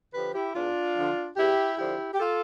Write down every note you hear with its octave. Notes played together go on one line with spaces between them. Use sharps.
D3 F3 G4 B4
E4 G4
E2 D4 F4
D3 F3
E2 E4 G4
D3 F3 E4 G4
G4
F4 A4